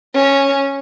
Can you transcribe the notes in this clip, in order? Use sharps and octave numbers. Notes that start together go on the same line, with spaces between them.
C#4